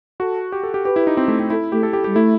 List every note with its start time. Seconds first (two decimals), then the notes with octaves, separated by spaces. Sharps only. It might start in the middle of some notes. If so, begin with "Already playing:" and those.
0.20 F#4 A4
0.52 G4
0.63 A4
0.74 G4
0.85 G4 B4
0.96 E4
1.07 D#4
1.17 C4
1.28 A3
1.40 C4
1.50 E4 A4
1.72 A3 G4
1.83 A4
1.93 G4
2.04 G3 G4
2.15 A3 E4